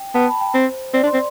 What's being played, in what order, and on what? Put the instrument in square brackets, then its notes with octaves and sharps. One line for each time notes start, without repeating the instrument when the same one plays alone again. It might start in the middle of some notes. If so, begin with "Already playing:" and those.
Already playing: [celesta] G5
[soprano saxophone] B3 [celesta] A5
[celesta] B5
G5
[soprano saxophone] C4 [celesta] C5
[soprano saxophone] C4 [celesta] D5
[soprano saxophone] D4
[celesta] C6
[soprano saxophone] C4